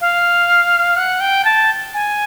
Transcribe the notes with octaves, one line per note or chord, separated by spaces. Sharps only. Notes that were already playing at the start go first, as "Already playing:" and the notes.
F5
F#5
G5
A5
G#5